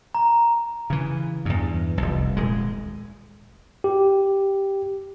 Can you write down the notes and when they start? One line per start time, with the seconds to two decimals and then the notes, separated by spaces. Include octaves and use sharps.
0.15 A#5
0.90 C#3 E3
1.45 E2 G2
1.98 F1 C2
2.37 D#1 G#3
3.84 G4